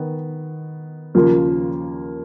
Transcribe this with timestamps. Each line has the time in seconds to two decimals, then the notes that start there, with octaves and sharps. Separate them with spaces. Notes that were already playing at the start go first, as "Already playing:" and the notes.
Already playing: D#3 B3
1.15 D#2 C#3 F3 A#3 F4